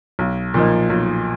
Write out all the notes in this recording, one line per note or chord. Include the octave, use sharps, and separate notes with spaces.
B1
A#2 F3 A#3 D#4
B1